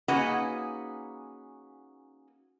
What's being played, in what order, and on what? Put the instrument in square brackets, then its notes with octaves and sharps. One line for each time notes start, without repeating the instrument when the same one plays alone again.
[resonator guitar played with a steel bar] A#3 C#4 D#4 F#4 G#4 B4